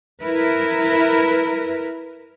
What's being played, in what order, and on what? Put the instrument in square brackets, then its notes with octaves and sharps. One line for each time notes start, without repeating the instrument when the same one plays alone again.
[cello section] E4 A#4 B4